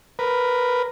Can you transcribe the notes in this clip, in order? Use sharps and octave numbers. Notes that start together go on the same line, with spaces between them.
A#4 B4